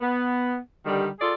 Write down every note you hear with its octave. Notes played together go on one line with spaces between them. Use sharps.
B3
D3 D#3 G3
F4 G#4 A4 D5